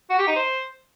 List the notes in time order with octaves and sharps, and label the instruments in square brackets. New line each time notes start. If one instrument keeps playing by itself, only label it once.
[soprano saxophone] F#4
G4
D#4
C5